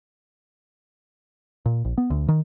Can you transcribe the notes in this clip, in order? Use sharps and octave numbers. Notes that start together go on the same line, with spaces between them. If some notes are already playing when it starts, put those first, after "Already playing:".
A#2
A#1
B3
D2
D#3